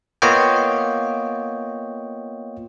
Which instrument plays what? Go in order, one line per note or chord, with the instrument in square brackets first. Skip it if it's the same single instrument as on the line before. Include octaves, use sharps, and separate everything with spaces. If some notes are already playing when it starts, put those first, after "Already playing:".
[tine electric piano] A#3 B3 F4 C#5 D#5 G5